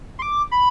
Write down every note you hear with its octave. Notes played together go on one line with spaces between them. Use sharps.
C6
D6
B5